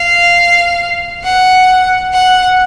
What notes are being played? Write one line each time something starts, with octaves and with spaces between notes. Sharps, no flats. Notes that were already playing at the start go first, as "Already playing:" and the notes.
Already playing: F5
F#5
F#5